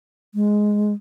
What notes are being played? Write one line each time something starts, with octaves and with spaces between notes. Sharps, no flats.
G#3